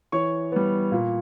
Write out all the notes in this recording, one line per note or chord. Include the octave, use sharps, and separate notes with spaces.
E3 C#5 C#6
G3 B3
A#2